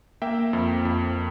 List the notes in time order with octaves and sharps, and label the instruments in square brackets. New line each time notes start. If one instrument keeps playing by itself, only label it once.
[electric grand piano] A#3 E5 G5
F2
F2